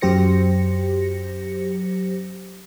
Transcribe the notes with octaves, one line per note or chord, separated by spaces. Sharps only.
F#2 F#3 G4 C5 A#6 C#7